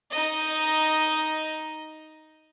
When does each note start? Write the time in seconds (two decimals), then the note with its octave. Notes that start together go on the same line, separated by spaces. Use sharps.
0.11 D#4 D#5